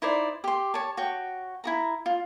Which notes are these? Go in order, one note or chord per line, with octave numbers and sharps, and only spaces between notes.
D#4 E4 C5 D5
G4 C6
C#5 A5
F#4 C#5 G5
E4 F#4 A#5
F4